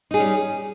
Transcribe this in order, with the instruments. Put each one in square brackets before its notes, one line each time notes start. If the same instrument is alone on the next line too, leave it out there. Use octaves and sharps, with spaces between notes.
[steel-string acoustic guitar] D#4
G#4
C#4
G3